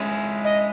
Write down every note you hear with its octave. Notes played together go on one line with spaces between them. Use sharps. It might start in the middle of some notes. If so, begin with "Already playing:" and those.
Already playing: G#3 C#4 E4
D#5